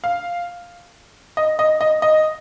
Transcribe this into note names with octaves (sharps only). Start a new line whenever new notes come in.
F5
D#5
D#5
D#5
D#5